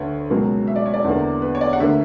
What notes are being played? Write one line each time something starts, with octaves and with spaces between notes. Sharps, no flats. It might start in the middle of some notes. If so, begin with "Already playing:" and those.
Already playing: D2 D3 B4 C#5
C#2 B2 F#3 A#3
E5
D5
C#5
D5
E2 D3 A#3
B4
C#5
D5
F#5
D2 D3 A#3 E5